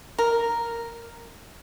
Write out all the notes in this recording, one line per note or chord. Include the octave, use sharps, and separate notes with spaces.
A#4